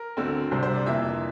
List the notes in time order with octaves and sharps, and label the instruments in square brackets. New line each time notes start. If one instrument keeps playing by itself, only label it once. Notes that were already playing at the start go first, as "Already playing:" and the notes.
Already playing: [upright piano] A#4
D2 D3 A3 C4
C2 C3 G3 D4 C5
C5
D5
F2 E3 A#3 D4 E5